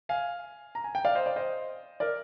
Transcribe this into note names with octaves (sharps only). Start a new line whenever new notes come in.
F5 G#5
A#5
G#5
G5
D5 F5
C5 D#5
D5 F5
C5 D#5
A#4 D5